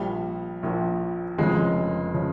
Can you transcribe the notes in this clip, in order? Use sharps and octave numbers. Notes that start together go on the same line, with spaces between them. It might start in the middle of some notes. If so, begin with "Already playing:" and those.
Already playing: A#1 A#2 F3 G3
A#1 A#2 F3
F1 F2 C#3 F3 G#3
C#3 F3